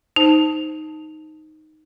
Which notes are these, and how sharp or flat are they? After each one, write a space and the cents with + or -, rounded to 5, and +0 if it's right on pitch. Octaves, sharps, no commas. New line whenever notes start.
D#4 +0 C5 +0 A5 +0